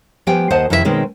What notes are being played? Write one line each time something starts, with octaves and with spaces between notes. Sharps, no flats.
F3 B3 G4 G5 G#5
D#2 C5 D#5 F#5 A5
F2 C3 D#3 E4 A#4 E5
B2 D#3 G#3 C4 C#4